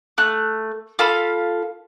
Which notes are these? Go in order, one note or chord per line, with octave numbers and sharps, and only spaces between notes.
A3 F#6
F4 A4 F5 B5